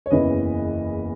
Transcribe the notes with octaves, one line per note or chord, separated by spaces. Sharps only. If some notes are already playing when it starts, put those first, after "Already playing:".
C#5
F#1 E2 C#3 E3 B4 D#5